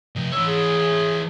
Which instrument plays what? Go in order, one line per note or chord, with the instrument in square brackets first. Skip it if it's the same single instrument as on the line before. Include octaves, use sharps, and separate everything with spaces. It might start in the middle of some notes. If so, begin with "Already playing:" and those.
[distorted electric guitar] C3 F3
[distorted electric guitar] E3 C#5 [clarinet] E6
[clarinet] G#4